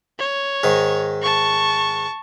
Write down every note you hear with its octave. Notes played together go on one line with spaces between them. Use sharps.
C#5
G#2 D#3
A5 C#6